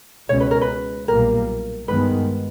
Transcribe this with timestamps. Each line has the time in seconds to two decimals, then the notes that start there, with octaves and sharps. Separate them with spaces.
0.29 C#2 B2 G#3 C#4 C#5
0.40 B4
0.51 A#4
0.61 B4
1.08 B1 A#2 G3 A#3 A#4
1.88 G2 D#3 G#3 B3 B4